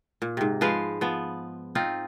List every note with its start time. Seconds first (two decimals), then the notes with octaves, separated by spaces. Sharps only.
0.22 A#2
0.37 G#2 C3
0.61 F3 G#3 B4 F5
1.01 F3 B3
1.75 C4 D#4 F4